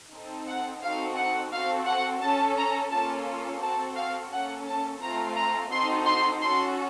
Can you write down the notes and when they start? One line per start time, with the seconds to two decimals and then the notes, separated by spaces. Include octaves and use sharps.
0.12 C4 D#4 A4
0.47 F#5
0.82 C4 D#4 F#4 A4 F5
1.17 F#5
1.52 C4 F#4 A4 F5
1.86 F#5
2.22 C#4 A4 A5
2.57 A#5
2.91 A#3 C#4 F4 A4 A5
3.62 C4 F#4 A4 A5
3.96 F5
4.31 A#3 C#4 A4 F#5
4.67 A5
5.01 A3 C4 F4 A4 A#5
5.36 A#5
5.71 C4 D#4 F#4 A4 C6
6.06 C6
6.41 C#4 F#4 A4 C6